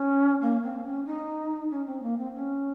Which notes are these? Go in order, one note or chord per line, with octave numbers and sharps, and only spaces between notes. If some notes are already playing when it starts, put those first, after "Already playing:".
Already playing: C#4
A#3
C4
C#4
D#4
C#4
C4
A#3
C4
C#4